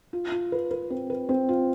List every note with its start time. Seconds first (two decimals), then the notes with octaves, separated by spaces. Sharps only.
0.13 F4
0.32 F4
0.52 B4
0.71 B4
0.90 C4
1.10 B4
1.29 C4
1.49 F4